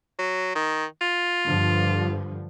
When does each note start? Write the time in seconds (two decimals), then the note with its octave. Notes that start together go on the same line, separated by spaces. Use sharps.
0.19 F#3
0.55 D#3
1.01 F4
1.46 G2 D3 F3